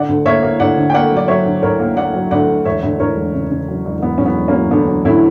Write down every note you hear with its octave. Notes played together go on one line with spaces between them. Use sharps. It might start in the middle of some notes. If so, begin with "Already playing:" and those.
Already playing: D3 D5 F#5
D2
A#3 C#5 E5
A#3
D2 D5 F#5
D3
G5
A#3 D5 F#5
F#3
D5
F#3 C#5 E5
D3
D2 A#4 C#5
A#3
A#3 D5 F#5
F#3
D2 D5 F#5
D3
E1 C#5 E5
D2
D2 A#4 C#5
E1
C#3
C#3
F#3
E1
E1 B3
F#3 C#4
B3
E1
A#3 C#4
F#3
D2 B3 D4
F#3
D2 C#4 E4